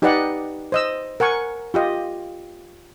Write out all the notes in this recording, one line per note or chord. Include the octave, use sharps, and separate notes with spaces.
D#4 G4 B4 D5 D#5 F#5
C5 D#5 E6
A#4 F#5 G#5 C#6
F4 G4 D#5